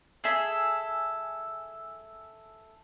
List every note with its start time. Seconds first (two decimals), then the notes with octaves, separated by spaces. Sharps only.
0.24 G#4 A4 E5